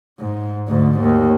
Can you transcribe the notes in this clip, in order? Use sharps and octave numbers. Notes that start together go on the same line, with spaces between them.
G#2
D2 G#2
D#2